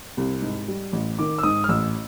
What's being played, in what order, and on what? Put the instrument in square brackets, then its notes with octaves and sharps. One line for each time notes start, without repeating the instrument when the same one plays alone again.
[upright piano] C2
G#2
G3
A1
[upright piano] D#3 [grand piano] D6
[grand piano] E6
[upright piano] G#2 [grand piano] D#6
[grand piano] F6
[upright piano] A1 [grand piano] E6